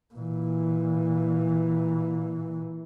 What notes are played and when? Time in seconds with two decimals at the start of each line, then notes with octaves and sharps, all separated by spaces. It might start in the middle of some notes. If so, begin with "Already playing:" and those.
0.15 A#2 E3